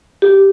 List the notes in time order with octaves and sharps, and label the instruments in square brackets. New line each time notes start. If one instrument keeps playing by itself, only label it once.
[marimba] G4